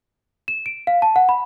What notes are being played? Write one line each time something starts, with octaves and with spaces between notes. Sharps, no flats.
E7
D7
F5
A5
F#5
B5